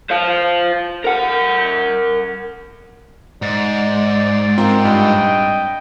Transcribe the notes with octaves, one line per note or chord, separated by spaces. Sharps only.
C5 F5
A#4 F#5
G#2 D5
C4 F4 A#4 G5
G2 D#5